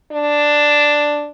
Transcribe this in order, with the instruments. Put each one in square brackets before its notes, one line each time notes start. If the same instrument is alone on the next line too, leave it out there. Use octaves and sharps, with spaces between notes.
[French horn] D4